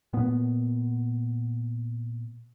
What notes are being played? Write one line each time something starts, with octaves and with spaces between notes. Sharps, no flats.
A#2 B3